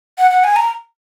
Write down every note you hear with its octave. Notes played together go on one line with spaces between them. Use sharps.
F#5
F#5
G#5
A#5